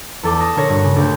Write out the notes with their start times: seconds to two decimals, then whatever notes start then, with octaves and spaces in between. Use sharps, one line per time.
0.23 E2 A4 D6
0.40 D#6 A6 A#6 E7
0.56 A#2 D3 A#4 C#5 A#6
0.69 G2 F#4
0.84 C#3
0.96 D2 F#4 D6 G6